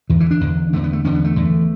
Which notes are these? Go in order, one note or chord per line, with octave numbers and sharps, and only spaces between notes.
E2 D3 E3
E3
D4
E2 D3
E2 D3 A3
B3
A3
E2 D3 C#4
B3
A3
E2 D3